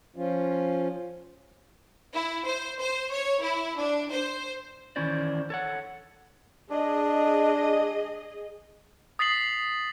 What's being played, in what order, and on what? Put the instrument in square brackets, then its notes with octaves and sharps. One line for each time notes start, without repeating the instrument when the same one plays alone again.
[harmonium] F3 C#4 F4
[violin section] E4
C5
C5
C#5
E4
D4
C5
[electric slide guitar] D#3 E3 C#4 E4 C5 D5
A4 C#5 F#5
[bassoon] D4 [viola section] G#4 D#5
[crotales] D#6 A6 B6 C7 F#7